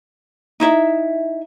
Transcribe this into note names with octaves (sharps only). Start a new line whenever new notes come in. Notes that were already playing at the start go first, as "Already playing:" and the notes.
D#4 E4 E5